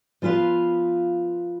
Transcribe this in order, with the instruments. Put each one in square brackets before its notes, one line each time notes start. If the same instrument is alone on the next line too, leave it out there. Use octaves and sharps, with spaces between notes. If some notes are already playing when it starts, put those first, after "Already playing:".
[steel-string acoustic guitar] F3 B3 F4 B4 F5